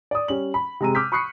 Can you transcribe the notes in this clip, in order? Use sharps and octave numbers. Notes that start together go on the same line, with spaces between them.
D5 D#6
G3 C#4 F#7
B5
C3 G#3 A#5 E6 D#7
D6 E6 F6 G6 B6
B5 C#6 D#6 F#6 C7 C#7